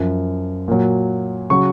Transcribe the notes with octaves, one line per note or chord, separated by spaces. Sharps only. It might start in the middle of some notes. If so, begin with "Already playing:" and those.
Already playing: F#2 F3
A#2 F#3
C#3 F#3 C#6